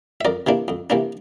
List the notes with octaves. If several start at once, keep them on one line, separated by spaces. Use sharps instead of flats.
E5
F2 A#4 D5
C3 E3 A#3 D4
F2
C3 E3 A#3 D4